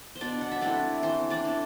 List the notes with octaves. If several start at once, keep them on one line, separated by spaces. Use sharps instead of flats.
C5
B2 D4 D5
F#5
E5
A3 C4 D4 E4 D5
E3 C4 C5
D4 D5
A3 E4